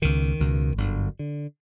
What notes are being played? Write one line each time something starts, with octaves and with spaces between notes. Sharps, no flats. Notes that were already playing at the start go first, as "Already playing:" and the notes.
C#2 B2 D#3
C#2 B2
G1 F#2 D3
D3